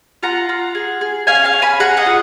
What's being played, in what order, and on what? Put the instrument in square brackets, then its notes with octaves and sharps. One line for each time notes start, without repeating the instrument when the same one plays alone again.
[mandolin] F4 F#5 A#5
F4
G#4
G#4
C#4 F5 G#5
F5 G#5
C#4
G#5 B5
G#4 F#5 A#5
D#5 F#5
F4